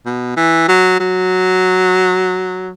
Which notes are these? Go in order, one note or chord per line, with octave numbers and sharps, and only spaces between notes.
B2
E3
F#3
F#3